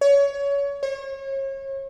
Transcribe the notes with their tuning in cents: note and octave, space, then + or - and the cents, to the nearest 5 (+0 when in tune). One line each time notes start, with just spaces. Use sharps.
C#5 +25
C#5 -35